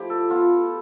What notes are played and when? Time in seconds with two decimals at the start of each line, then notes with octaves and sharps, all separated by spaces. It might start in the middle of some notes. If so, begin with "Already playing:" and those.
Already playing: F3 A3 E4 G4
0.10 A4
0.30 B3 E4 F4